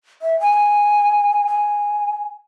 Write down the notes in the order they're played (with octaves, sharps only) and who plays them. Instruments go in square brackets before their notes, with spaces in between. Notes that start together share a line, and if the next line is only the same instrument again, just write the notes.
[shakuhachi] E5
G#5
G#5